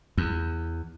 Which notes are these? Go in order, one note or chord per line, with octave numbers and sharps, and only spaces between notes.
E2